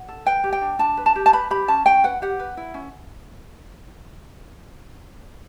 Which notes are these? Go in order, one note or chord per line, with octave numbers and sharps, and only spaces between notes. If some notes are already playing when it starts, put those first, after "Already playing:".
Already playing: F#5
A4
B4 G5
G4
G5
D4
D4 A5
B4
A5
G4
A5
B4 B5
G4 B5
C#4 A5
C#4 G5
B4 F#5
G4 F#5
B4
E4
C#4